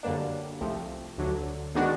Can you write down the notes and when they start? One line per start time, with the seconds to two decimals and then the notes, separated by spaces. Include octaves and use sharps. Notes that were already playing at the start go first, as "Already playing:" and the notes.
0.03 F#2 D3 G3 A#3 D4
0.61 C2 C3 F3 A3
1.18 D2 D3 F#3
1.75 D#3 G#3 B3 D4 F#4